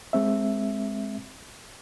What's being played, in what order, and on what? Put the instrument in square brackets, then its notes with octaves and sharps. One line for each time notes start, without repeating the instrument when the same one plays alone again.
[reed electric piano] G#3 C4 E5